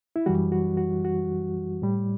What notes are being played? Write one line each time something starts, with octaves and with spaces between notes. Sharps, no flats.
E4
F#2 E3 G3 F#4
F#4
F#4
F#4
A2 G3